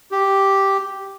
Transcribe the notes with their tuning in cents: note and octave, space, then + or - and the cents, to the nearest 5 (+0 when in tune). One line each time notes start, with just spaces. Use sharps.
G4 -5